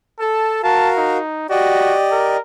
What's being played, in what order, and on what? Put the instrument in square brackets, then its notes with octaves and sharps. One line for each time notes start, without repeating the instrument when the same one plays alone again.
[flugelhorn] A4 [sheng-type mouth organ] A5
[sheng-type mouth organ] F#4 A#4 F5 [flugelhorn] A5
[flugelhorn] D#4
[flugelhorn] F#4 [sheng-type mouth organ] G4 D5 D#5
[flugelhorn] A#4